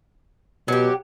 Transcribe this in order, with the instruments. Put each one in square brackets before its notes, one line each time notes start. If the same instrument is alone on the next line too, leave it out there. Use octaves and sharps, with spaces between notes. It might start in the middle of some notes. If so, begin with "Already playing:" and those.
[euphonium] B2 [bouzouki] F#3 G4